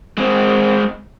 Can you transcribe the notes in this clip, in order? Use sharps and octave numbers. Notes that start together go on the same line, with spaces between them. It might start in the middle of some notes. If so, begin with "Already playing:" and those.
G#3 C4